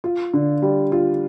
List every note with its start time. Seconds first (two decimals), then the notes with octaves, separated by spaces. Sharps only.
0.04 F4
0.34 D3
0.62 G3
0.92 F4